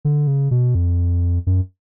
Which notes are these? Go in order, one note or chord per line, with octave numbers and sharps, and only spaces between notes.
D3
C#3
B2
F2
F#2